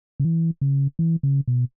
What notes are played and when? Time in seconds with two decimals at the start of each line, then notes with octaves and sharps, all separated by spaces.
0.20 C#3
0.25 E3
0.61 C#3
0.99 E3
1.23 C#3
1.48 B2